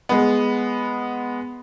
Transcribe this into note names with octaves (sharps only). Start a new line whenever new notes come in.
G#3 B3